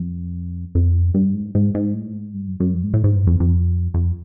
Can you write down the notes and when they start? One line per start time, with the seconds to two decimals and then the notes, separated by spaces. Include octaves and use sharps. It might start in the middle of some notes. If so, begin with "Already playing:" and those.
Already playing: F2
0.75 F2
1.14 G2
1.35 G#2
1.55 G#2
1.75 G#2
1.94 A2
2.14 G#2
2.34 G2
2.48 F#2
2.60 F#2
2.74 F2
2.84 G#2
2.94 A2
3.04 G#2
3.14 G2
3.27 F2
3.40 F2
3.94 F2